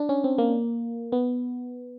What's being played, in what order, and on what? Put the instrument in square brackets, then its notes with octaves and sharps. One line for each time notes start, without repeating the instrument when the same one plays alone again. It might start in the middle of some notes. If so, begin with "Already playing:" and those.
Already playing: [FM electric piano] D4
C#4
C4
A#3
B3